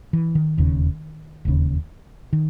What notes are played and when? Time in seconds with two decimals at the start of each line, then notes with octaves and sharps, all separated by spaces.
0.13 E3
0.35 D#3
0.57 E1 D#2 C#3
1.45 E1 D#2 C#3
2.33 D#3